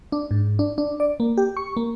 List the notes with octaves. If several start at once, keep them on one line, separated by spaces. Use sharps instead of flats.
D4
G#2
D4
D4
D5
A#3
G4
C#6
A#3